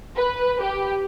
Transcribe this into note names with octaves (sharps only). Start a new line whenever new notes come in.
B4
G4